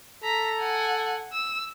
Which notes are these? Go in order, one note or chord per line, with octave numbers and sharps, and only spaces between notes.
A4 A#5 B6
F#5 G#5
E6